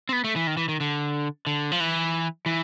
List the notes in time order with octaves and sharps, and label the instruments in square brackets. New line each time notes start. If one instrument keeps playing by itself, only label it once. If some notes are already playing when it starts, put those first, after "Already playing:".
[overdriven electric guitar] C4
B3
A3
E3
D#3
E3
D#3
D3
D3
F3
E3
E3